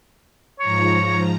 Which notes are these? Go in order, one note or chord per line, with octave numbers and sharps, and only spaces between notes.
G#2 F3 C#5 A#5